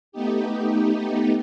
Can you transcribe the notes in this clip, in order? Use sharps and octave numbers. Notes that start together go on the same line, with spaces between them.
A3 B3 D#4 G4